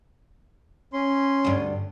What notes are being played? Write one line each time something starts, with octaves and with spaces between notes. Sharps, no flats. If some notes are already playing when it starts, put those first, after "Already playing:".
C#4 C6
D2 G2